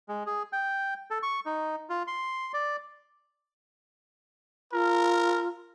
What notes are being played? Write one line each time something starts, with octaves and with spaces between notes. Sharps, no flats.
G#3
G#4
G5
A4
C#6
D#4
F4
C6
D5
F4 A#4